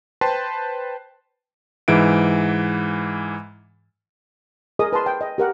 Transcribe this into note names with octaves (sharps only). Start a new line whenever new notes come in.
B4 C5 G5 A5 C6
G#2 E3 E5 D7
G#4 A#4 D#5 D#6
B4 A5 C6
G5
D#5
G4 A#4 F#5